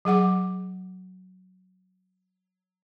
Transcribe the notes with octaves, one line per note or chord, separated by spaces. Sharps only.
F#3 G#4 F#5 D6